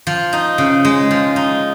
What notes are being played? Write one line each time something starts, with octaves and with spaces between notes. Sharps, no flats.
F3
D#4
C#3
G#3
F3
D#4